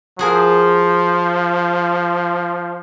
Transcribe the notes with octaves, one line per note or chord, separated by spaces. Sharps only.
F3 F#4 G#4 A#4